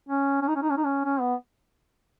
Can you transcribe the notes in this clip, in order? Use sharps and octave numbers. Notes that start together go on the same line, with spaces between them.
C#4
C#4
D#4
C#4
D#4
C#4
D#4
C#4
C#4
B3